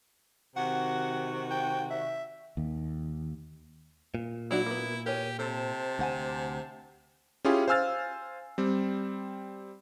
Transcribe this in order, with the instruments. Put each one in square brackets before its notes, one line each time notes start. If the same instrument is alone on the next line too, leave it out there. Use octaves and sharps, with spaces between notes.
[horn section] C3 D#3 F#4 [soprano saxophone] F#5
[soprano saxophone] G5
E5
[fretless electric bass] D#2
[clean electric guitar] A#2
[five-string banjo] F#3 D4 F#4 [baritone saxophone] E4
[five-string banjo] A#3 B3
[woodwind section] E2 G#5 [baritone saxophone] G4 [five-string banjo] A#4 C#5
[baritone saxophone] C3 [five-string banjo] A4 [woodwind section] C5 A5
[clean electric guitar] D2 F#5 G#5
[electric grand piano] C#4 E4 F4 G4 G#4 G#5
C5 F5 G#5 E6 F6 A6
G3 C4